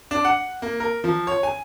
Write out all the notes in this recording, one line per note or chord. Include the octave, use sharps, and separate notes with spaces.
D4
F#5
A#3
A#4
F3
C#5
G#5